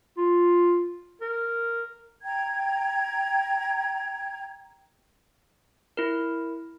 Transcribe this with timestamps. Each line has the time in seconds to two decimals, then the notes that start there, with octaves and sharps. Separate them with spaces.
0.18 F4
1.22 A#4
2.23 G5 A#5 G#6
5.97 E4 A#4